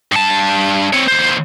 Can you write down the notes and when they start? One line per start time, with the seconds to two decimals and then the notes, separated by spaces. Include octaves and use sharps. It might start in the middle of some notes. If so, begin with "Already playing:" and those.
0.12 G2 A5
0.93 C4 C#5
1.08 D#2 C5